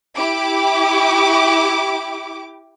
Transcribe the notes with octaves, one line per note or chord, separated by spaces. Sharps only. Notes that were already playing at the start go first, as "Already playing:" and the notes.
E4 G4 D6